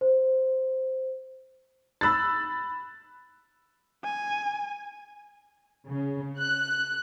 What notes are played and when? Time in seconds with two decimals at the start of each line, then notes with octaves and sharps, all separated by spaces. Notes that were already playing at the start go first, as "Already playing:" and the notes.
0.01 C5
2.01 B5 E6 F#6 A6
4.04 G#5
5.87 C#3
6.40 F#6